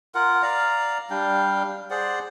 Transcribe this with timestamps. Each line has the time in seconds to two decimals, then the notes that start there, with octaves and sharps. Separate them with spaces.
0.15 F4 A#4 F#5
0.42 D5 F5 A#5
1.10 G3 D4 F5 G5
1.90 G#4 C5 D5 F#5